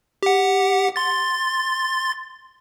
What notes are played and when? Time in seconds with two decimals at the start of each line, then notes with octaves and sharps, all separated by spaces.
0.23 G4 F#5
0.96 C6 A6